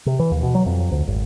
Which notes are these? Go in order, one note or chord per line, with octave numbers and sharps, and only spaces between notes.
C3
E3
D#2
B2
F#3
F2
D2
G#1